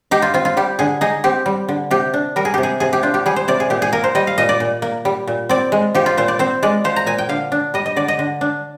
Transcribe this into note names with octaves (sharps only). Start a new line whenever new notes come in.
D#4 G4
F4
C4 F4
F4
G3 G4
D3 G#4
D#4 G#4
C4 G4
G3
D3
C3 G4
D4
G3 A#4
G#4
C3 G4
G#4
C3 G#4
G4
D4 F4
G4
G3 G#4
C5
C3 D5
G#4
A#2 G4
G#4
A#3 A#4
C5
G3 D#5
F5
A#2 D#5
D5
A#2
A#3
G3
A#2
C4 D5
G#3
F3 G4
F4
A#2 C5
D5
C4 C5
G#3 D5
F3 C5
A#5
A#2 G#5
G5
D3 F5
D4
G3 D#5
D#5
D3 D5
D#5
D3
D4